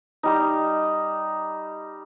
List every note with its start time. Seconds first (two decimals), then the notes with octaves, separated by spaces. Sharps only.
0.23 G3 D#4